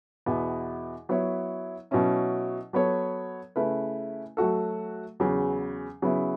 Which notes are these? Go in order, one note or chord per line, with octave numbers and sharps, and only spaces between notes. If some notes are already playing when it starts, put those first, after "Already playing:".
E2 B2 B3 E4
F#3 B3 E4 C#5
B2 F#3 C#4 E4
F#3 B3 A4 C#5
C#3 A3 E4 B4
F#3 A3 F#4 A4
E2 C#3 F#3 B3
C#3 F#3 B3 E4